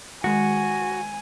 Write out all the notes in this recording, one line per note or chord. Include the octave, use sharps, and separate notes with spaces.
D#3 G#3 F#4 G#5